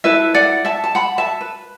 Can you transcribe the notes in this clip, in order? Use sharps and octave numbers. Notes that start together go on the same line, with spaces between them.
E4 A4 B4 E5
D5 F#5
E5 A5
A5
F#5 B5
E5 A5
B4